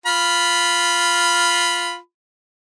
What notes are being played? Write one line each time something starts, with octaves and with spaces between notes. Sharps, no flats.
F4 B5